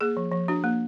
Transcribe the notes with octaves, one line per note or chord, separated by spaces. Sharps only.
A#3 G#4
F3
F3
D4 F#4
A#3